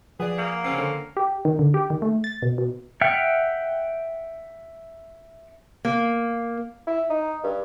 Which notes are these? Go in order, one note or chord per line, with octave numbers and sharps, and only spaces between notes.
F3 G#4 B4 D5 F#5
A#3
C#3 C4 C#4 C7
D3
G4
D#3
D3
G4
D#3
A3
A6
B2
B2
E5 F#5 G5 F6
A#3
E4
D#4
G2